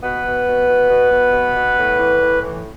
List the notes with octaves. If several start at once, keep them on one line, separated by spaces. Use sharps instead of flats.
B2 B3 B4
B2
B2
B2
B2
B2
B2
B2
A2
E3
A2
E3